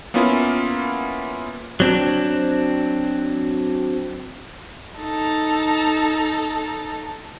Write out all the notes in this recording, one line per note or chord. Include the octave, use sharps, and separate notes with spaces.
A#3 B3 C#4 E4 F4
F#3 C4 D4
D#4 A4